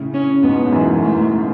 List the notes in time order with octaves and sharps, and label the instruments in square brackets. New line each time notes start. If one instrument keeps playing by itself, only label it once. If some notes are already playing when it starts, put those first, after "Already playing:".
Already playing: [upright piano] A2 C#3
[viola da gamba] C#4
[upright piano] G#2 B2 [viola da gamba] B3
[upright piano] G#2
[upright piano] F#2 A2 [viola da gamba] E3
[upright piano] F#2 A2
[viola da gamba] A3